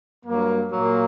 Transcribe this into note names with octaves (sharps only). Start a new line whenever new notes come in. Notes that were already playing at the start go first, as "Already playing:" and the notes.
G2 F#3 A#3
A#2 F#3 A#3